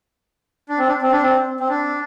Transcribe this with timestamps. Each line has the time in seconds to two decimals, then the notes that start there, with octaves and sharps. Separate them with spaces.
0.69 D4
0.78 C4
0.88 D4
1.02 C4
1.12 D4
1.22 C4
1.60 C4
1.69 D4